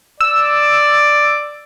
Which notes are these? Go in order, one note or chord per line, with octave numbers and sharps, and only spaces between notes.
D5 E6